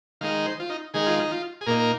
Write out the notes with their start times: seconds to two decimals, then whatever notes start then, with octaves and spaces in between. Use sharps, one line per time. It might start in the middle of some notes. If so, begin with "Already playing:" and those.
0.21 D#3 G#3 D#4 F5
0.46 C5
0.60 F4
0.69 D#4
0.94 D#3 G#3 D#4 G#4
1.07 F4
1.19 D#4
1.31 F4
1.61 G#4
1.66 A#2 A#3 D#4 A#4
1.80 A#4